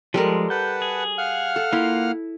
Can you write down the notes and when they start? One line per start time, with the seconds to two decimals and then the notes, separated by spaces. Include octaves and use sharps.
0.14 F3 G3 G#3 A4 A#4
0.50 B4 F#5 A5 G6
0.82 G#4
1.18 F5 F#5 F6
1.56 A4
1.73 A#3 E4 F4